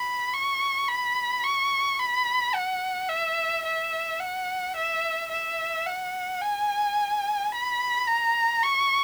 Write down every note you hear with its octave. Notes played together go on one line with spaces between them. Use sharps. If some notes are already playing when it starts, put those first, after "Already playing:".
Already playing: B5
C#6
B5
C#6
B5
F#5
E5
E5
F#5
E5
E5
F#5
G#5
B5
A#5
C#6